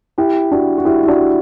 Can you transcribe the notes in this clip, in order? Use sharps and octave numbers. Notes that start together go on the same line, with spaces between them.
E4 G4
D4 F#4
F#4
E4 G4
E4
D4 F#4